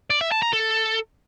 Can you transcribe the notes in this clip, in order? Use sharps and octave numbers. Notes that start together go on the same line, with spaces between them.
D5
E5
A5
A#5
A4